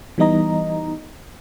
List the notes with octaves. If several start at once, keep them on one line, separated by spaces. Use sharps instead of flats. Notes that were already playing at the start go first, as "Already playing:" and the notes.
E3 G3 B3 D#4 D#5 A#5